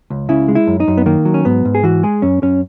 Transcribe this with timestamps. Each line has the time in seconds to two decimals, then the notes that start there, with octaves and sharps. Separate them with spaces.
0.10 C#2
0.29 C#3 E4
0.48 G#3
0.55 E4
0.67 F#2
0.80 D#4
0.88 F#2
0.97 B3
1.06 D#3 A#3
1.25 F#3
1.34 C#4
1.45 G#2 B3
1.65 G#2
1.75 G#4
1.83 E3 F#4
2.03 G#3 G#4
2.22 F#2 C#4
2.42 F#2 C#4